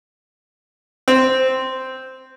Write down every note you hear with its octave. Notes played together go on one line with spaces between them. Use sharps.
C4